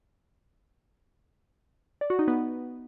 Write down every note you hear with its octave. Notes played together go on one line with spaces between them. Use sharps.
D5
F#4
D#4
B3